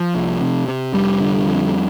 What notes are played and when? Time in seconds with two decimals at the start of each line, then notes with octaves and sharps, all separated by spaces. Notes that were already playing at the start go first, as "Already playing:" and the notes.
Already playing: F3
0.15 C2
0.41 C3
0.68 C3
0.93 F1 G3
1.20 D3
1.47 F2